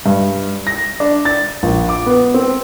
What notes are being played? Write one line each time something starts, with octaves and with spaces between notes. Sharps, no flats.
G2
A#6
D4
A6
A#1
D6
B3
C4